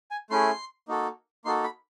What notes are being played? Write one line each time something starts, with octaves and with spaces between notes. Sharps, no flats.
G#5
A3 C#4 E4 G#4 C6
A#3 D#4 F#4 A4
A#3 D#4 F#4 A4 C6
B5